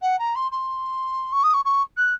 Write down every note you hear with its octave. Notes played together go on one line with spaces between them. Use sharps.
F#5
A#5
C6
C6
C#6
D#6
C#6
C#6
F#6